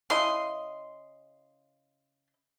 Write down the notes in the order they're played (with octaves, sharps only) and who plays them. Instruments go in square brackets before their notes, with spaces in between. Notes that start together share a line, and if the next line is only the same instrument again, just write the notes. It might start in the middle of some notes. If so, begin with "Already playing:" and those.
[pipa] C#3 E4 D#5 [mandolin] C6